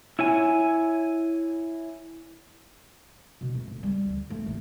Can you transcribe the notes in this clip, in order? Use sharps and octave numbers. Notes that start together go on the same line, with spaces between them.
E4 C#5 G#5
B2
A3
G1
G3
D2
A3
A1